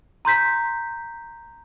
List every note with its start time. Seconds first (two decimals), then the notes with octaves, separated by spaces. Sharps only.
0.25 A#5 C6 G6 B6